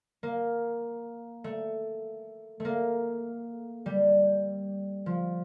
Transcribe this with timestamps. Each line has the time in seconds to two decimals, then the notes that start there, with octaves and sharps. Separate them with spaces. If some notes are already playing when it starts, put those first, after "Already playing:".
0.23 A#3
1.44 A3
2.60 A3 A#3
3.86 G3
5.06 F3